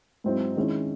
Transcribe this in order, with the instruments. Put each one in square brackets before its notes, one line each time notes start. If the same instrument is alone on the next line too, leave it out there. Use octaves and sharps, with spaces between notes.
[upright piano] G#2 F#3 C4 E4
D#3 G#3 C#4 E4